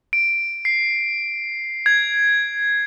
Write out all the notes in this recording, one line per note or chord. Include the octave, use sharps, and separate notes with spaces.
D7
C7
G#6